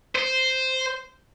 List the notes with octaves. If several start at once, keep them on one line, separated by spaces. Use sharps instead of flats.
C5